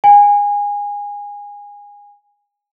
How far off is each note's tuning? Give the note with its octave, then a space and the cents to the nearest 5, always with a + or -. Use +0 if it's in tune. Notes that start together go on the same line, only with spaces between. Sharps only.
G#5 -25